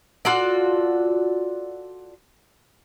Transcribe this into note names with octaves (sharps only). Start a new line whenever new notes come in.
F4 F#4 A4 D5